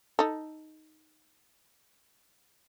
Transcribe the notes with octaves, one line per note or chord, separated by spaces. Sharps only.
D#4 A4